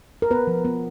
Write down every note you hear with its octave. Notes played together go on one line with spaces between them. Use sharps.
A#4
B3 B4
F3
B3